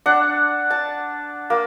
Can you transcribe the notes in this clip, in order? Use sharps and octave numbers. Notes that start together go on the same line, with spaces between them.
D4 F#5
A5
A#3